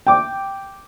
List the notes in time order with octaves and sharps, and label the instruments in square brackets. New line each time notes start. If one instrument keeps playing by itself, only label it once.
[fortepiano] G5 D6